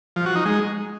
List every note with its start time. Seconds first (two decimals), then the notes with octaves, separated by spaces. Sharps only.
0.16 F3
0.26 F#4
0.36 D#4
0.45 G#3